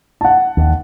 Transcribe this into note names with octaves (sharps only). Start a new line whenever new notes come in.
F#5 A5
D#2